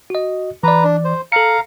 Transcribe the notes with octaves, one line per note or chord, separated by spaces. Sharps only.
F#4 D#5
E3 B4 D5 A#5
D4
C5
A4 F5 A#5 C#7